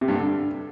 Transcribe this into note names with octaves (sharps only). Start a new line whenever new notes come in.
C3
G2
D3